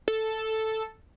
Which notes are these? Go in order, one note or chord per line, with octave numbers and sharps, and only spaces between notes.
A4